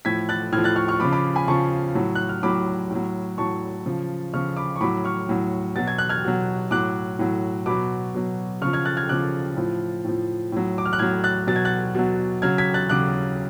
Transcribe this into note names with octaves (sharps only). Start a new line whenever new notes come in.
A2 F3 G#6 B6
F#6 A6
A2 F3 F6 G#6
F#6 A6
C#6 F6
C#6 F6
C#3 F3 B5 D6
B5 D6
G#5 B5
C#3 F3 A5 C#6
A2 F#3
F#6
F6
A2 F#3 B5 D6
A2 F#3
A2 F#3 A5 C#6
C#3 F3
C#3 F3 C#6 F6
B5 D6
C#6
A2 F#3 B5 D6
C#6 F6
A2 F#3
B2 F#3 A6
G#6
F#6
F6 G#6
B2 F#3
A2 F#3 D6 F#6
A2 F#3
B2 F#3 B5 D6
B2 F#3
C#3 F3 C#6 F6
F6 G#6
F#6 A6
F6 G#6
C#3 F3 D6 F#6
A2 F3
A2 F3
A2 F#3
D6
F6
F#6
A2 F#3 F6 G#6
F#6 A6
B2 F#3 A6
G#6
F#6 A6
B2 F#3
C#3 F#3 F6 G#6
G#6 B6
F#6 A6
C#3 F#3 D6 F#6